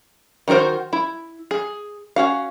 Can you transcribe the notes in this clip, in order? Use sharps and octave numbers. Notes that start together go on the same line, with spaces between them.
D#3 D#4 F#4 A#4 C5
E4
G#4
C#4 F#4 F5